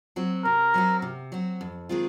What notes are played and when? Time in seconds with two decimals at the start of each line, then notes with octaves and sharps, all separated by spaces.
0.16 F#3 C4 F#4
0.45 C3 A#4
0.74 F#3 C4 F#4
1.02 C3
1.32 F#3 C4 F#4
1.61 F2
1.89 D#3 G#3 C4 F4